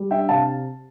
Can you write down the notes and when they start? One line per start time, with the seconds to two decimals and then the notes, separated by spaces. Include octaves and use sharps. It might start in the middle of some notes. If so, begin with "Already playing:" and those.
Already playing: G3
0.11 D4 E5 G5
0.29 C3 F5 A5